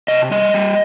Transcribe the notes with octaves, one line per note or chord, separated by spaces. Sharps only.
C3 D#5
G3 D#5
G3